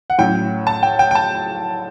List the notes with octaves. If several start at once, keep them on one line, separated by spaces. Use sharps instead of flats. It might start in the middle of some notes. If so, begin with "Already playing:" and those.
F#5
A2 F#3 C#4 G5
A5
G5
G5
G5
A5